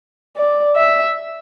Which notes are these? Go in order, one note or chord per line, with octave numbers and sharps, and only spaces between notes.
D5
E5